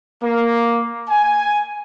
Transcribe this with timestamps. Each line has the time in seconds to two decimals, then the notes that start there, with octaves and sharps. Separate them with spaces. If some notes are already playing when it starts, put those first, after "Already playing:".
0.22 A#3
1.09 G#5